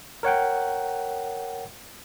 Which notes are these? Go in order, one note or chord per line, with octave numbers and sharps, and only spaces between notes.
A#4 C#5 F#5 G5